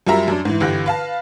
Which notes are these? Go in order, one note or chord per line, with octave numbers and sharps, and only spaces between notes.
F#2 G3 F4 A#4 E5 A#5
F#2 D4
G#2 E3
G1 D3 E3 G4 F#6 A#6
B4 F5 A5